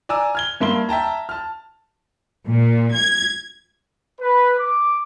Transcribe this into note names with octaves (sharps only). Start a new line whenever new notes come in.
D5 G#5 A#5 E6
F6 G#6 G7
G2 A#3 E5 C6 G7
E5 G5 A5 A#5
A5 F6
A#2
G#6
B4
D6